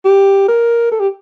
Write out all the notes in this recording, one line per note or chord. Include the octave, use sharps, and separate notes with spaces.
G4
A#4
A4
G4